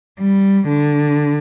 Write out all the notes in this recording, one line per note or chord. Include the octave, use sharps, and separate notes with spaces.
G3
D3